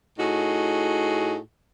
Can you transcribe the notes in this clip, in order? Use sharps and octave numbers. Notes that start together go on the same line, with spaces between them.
A2 D#4 F#4 G#4